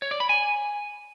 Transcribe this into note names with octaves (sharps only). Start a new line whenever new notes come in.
C#5
D5
B5
G#5